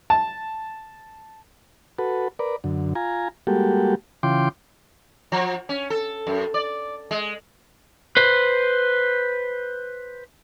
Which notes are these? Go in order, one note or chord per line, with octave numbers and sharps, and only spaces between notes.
A5
F#4 A4 B4
A#4 B4 D5
F#2 D3
F4 G#5 A#5
G3 G#3 A#3 F#4 G4 A4
C#3 E3 F4 G5 C6 D6
F3
C#4
A4
F#2
D5
G#3
B4 C5